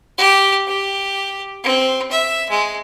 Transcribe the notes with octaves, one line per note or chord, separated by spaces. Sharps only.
G4
G4
C4
E5
G#3